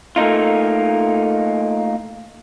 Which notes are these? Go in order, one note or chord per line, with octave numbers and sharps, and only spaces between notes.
A3 A#3 D#4 F4